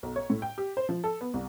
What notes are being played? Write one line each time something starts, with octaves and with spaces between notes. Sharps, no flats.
B1
C#5
A2
G5
G4
C5
F3
A4
B3
C2